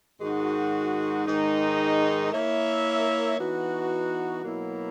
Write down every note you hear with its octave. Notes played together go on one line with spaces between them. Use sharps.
G#2 D#3 G#3 D#4 F#4
G#2 D#3 G#3 D#4
A#3 E4 A#4 C#5 E5
E3 B3 D#4 F#4
B2 F#3 A#3 E4